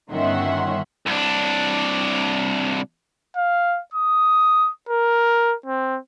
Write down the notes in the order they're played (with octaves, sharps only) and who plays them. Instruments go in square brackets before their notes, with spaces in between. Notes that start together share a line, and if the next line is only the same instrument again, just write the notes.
[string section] G1 D#3 C#4 E5 F#5 C6
[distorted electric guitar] C2 D4
[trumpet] F5
D#6
A#4
C4